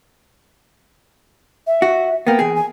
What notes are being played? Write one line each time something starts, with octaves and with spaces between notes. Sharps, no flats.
E5
F#4
A#3 B3 G5
E2 G#4
G#5